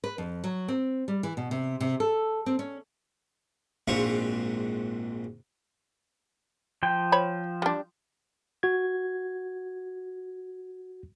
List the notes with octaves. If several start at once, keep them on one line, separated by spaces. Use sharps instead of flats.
B4
F2
F#3
C4
G3
E3
B2
C3
C3
A4
C4
C#4
A#1 G#2 C4 F#4 F5 C#6
F3 G5
C5 C#5 B5
G3 D4
F#4 G#6